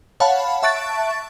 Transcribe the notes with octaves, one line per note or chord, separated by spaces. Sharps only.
C#5 F5 F#5 A5 B5
E5 A5 C#6 F#6 A6 D7